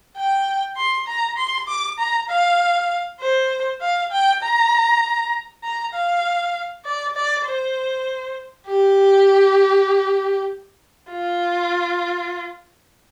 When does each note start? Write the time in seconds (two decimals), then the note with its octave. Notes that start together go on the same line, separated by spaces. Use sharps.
0.17 G5
0.77 C6
1.07 A#5
1.37 C6
1.68 D6
1.99 A#5
2.29 F5
3.20 C5
3.82 F5
4.12 G5
4.43 A#5
5.64 A#5
5.94 F5
6.86 D5
7.16 D5
7.46 C5
8.68 G4
11.11 F4